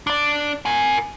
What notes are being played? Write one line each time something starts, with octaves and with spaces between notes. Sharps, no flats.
D4 D5
A#4 G#5